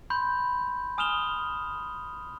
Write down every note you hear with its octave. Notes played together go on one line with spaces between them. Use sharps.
B5 C6 G6
G#5 D#6 F6 E7 F7 G7